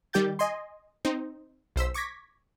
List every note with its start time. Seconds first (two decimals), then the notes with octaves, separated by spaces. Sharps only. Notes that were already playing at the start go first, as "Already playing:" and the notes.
0.13 D#3 G3 G4 G5 G6 A6
0.39 D#5 G#5 C6
1.05 C4 D#4 C5
1.76 B1 C5 E6 B6
1.94 C#6 D6 G#6 A#6 B6